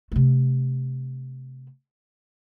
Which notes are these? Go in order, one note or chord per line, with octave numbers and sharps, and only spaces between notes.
C3 A3